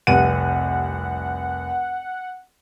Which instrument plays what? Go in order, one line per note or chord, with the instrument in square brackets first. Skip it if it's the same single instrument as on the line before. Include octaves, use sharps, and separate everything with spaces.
[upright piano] F1 C2 D#7 [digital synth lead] F#5